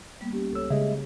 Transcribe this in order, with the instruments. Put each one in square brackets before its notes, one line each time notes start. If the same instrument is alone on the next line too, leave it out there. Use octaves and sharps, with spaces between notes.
[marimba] G3 A#3 B3
C#4 G4
[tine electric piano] C#2 E6 [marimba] A4 C#5
[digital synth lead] C#3 [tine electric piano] G#3 D#5 E5 [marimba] G#4